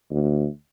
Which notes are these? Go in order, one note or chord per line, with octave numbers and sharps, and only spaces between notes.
D2